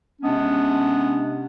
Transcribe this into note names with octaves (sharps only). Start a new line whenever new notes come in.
C3 G#3 B3 C#4 D4